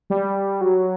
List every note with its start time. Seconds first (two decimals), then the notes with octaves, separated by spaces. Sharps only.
0.10 G3
0.61 F#3